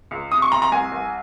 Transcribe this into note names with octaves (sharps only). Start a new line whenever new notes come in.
C#2
C3 D#6
C#6
C3 A#5
A#5
C2 G#5
C2